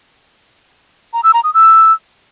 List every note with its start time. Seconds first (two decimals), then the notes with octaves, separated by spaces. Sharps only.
1.13 A#5
1.23 E6
1.34 A#5
1.44 D#6
1.54 E6